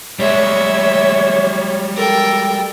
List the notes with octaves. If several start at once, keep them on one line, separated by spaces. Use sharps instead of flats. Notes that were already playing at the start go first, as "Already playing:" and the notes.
G3 G#3 C#5 E5
A4 A#4 G5